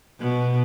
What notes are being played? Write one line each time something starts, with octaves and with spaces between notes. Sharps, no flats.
B2